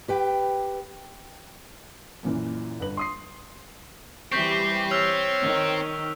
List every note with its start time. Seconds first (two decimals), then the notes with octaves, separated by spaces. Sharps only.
0.08 G4 B4 G5
2.23 F#2 A#2 E3
2.80 G1 B4 F#7
2.97 C6 D#6 C7
4.32 E3 G3 C4 G4 C#6 G6 B6
4.91 C#5 E6 F6 F7
5.42 D#3